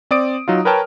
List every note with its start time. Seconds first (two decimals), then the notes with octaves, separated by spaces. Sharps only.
0.11 C4 D5 D#6 D7
0.48 F#3 D#4 F4
0.65 A#4 B4 C#5 G5 A5 F6